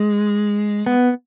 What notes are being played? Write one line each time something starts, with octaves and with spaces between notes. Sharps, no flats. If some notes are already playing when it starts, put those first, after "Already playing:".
Already playing: G#3
B3